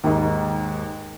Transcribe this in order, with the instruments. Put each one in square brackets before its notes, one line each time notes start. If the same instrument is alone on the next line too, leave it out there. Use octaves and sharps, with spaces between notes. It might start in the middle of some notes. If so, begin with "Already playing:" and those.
[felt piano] D#2 G#2